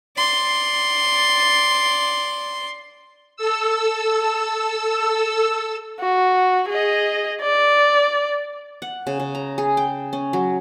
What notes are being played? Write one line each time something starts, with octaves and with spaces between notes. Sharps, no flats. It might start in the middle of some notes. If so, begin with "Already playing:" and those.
D5 C6
A4 E6
F#4
G#4 D#5
D5
F#5
C#3
C#3
A#5
G#4
G5
C#4
F#3